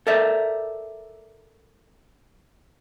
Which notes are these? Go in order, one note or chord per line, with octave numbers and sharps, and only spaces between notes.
A4 A#4 D5 E5